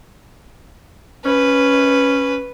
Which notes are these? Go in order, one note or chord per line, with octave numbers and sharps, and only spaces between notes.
C#4 B4